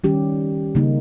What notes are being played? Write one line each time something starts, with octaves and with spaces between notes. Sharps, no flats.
D#3 G3 C#4 G4
C#3 G3 A#3 D#4